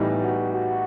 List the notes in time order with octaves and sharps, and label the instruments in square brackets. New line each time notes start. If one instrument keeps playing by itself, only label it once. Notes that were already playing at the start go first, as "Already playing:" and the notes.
Already playing: [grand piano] A2 E3 G3 B3 D#4
[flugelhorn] F#4
F#4